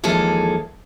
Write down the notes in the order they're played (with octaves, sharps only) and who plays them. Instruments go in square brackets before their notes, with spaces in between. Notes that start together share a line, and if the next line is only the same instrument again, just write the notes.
[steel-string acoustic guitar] D#2 E3 F3 G#3 G#4 A4